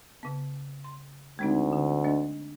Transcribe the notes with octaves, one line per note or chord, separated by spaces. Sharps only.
C#3 B3
C6
D2 G#3 C4 D#4
D3
A3 D4 D#5